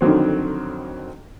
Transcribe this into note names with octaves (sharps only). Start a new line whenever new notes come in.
F2 D3 D#3 F#3 C4